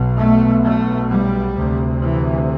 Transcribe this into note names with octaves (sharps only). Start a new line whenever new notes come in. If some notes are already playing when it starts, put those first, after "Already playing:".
Already playing: B1 B2
A3
A3
G3
D2 C3
E3